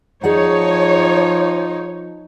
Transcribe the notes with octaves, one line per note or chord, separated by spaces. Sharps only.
F3 D#4 G#4 C#5 D5 F#5